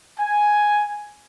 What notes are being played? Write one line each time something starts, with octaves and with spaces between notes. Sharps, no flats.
G#5